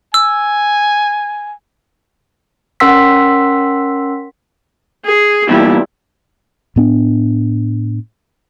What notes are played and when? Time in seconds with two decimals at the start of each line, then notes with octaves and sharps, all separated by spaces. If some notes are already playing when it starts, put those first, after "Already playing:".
0.14 G#5 E6
2.80 C#4 A#4 F#5 C6 E6 B6
5.05 G#4
5.49 E2 A#2 G3 E4
6.76 A2 B3 D4